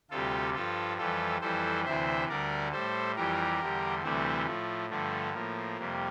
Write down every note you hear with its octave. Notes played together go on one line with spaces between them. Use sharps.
D2 C3 G3 F4 A4
G2 F3 F4 A4
F2 E3 G3 F4 A4
F2 E3 G3 A4 C5
D2 C3 E3 C5 E5
D2 D3 G3 A#4 D5
A2 G3 A4 C5
F2 E3 G3 G4 A#4
E2 D3 G3
D2 C3 E3 G3 A3 C4
A2 F3 A3
G2 D3 F3 A3
A2 F3 A#3
F2 C3 G3